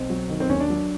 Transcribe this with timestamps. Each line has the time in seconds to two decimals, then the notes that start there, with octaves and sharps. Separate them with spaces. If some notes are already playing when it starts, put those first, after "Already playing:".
Already playing: B1 C4
0.10 F#3
0.30 D#3
0.40 C4
0.49 D#2 C#4
0.60 D4
0.70 F#3